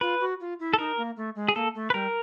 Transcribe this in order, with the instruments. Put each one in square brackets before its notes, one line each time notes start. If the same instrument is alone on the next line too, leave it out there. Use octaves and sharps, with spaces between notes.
[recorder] F4 [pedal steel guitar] B4
[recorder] F#4
F4
E4
[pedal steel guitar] A4
[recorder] D#4 [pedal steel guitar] A#4
[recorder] A#3
A3
G#3
[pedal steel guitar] G#4
[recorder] A#3 [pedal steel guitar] A4
[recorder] A3
[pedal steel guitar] B4
[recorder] G3 [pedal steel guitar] A#4